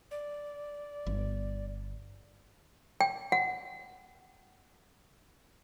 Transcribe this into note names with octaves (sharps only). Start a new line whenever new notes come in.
D5
G1
G5
F#5